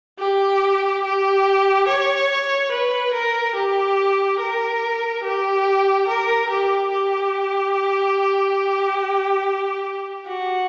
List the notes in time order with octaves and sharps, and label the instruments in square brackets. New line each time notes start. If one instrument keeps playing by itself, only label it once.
[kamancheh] G4
G4
C#5
B4
A#4
G4
A#4
G4
A#4
G4
G4
F#4